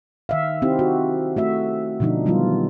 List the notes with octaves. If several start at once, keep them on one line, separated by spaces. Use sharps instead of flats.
D#3 E5 F5
C4 D#4 E4 G4
F#4
A3 F#4 E5
B2 D3 F3 D4 D#4
D#3 F#3 G3 B3 E4 F4